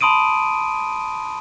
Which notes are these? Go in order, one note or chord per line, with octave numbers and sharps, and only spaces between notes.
A5 B5 C6 D#6 D7 D#7